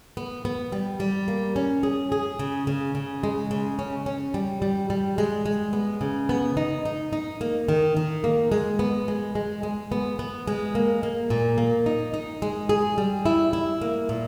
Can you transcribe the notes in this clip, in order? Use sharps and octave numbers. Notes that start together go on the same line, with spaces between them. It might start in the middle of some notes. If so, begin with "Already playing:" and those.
B3
B3
G3
G3
A#3
C#4
G#4
G#4
C#3
C#3
C#3
G#3
C#3
C#4
C#4
G3
G3
G3
G#3
G#3
B3
C#3
B3
D#4
D#4
D#4
A#3
D#3
D#3
A#3
G#3
B3
G#3
G#3
G#3
B3
B3
G#3
A#3
A#3
A#2
A#3
D#4
D#4
G#3
G#4
G3
E4
E4
A#3
A#2